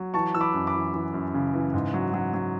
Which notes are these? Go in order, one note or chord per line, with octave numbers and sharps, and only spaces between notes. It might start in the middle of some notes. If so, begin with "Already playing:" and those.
Already playing: F#3
E3 A5 C#6
E3 E6
B5 D6
F#2
B5 D6
E3
E3
F#2
C#3
E3
G#2
F#3
F#3
F#3